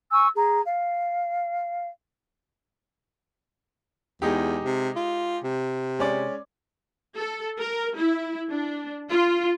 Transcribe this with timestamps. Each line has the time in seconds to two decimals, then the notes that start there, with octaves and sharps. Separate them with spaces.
0.11 G#5 C#6 E6
0.36 G#4 A#5
0.64 F5
4.22 E2 G#3 D#4 G4
4.65 C3
4.96 F4
5.44 C3
5.99 G#3 C#4 D5
7.17 A4
7.58 A#4
7.96 E4
8.49 D4
9.10 F4